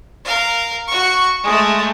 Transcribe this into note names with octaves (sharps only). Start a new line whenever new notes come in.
A#4 F5
F#4 C#6
G#3 A3